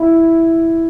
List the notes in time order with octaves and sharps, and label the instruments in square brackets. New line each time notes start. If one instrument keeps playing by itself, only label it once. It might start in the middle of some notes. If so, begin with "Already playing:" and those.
Already playing: [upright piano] E4